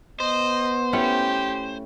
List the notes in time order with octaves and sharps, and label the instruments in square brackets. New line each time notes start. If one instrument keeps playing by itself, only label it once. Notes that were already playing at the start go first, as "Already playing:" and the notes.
[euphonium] B3 [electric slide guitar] C5 [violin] D#5
[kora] A3 C#4 E4 [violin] G4